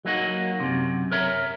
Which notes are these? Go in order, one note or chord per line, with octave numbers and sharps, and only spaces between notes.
F#3 A#3 D#4 F#4
F#2 C3
A#4 C#5 E5 A#5